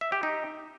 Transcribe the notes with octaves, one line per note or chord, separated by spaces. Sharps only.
E5
G4
D#4